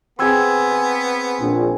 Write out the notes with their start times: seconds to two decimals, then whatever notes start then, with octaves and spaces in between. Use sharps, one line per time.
0.19 B3 C4 G#4 C6 E6 G#6
0.72 G#5
1.41 A#1